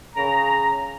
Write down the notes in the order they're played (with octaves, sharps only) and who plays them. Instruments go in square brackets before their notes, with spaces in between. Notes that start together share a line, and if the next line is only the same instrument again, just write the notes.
[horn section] C#3 A#5